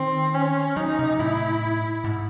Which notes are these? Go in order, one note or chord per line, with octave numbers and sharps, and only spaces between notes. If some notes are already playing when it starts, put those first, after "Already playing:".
Already playing: D#3 C4
C#4
F#3 D#4
C3
A2 E4
G#2